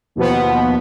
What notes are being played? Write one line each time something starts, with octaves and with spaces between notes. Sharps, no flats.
D#2 B2 F3 B3